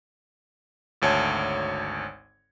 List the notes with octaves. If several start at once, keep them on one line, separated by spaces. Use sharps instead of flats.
G#1 D2 C#5 A5 G#6